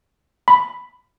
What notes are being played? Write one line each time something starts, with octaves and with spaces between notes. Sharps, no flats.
B5